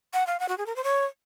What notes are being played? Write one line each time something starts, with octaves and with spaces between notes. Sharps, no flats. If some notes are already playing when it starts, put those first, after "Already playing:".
F#5
F5
F#5
F#4
G#4
A#4
C5
C#5